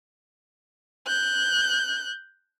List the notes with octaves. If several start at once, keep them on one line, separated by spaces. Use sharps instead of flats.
F#6 G6